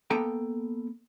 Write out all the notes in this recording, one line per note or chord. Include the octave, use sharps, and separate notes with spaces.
A#3 B3 A4 G5 A#5